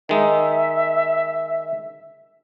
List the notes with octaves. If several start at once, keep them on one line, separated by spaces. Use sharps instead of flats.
D#3 G#3 D#4 E5